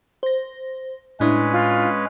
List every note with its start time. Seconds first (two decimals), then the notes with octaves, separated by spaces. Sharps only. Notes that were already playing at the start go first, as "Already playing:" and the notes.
0.23 C5 A#6
1.20 A2 G#3 C#4 D4 E4 B4
1.52 F4